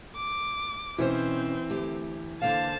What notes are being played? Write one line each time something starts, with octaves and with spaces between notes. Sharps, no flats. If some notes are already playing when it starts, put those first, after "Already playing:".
D6
B2 E3 C4 C#4 C5
D2 G4
D3 A#3 C5 F5 A5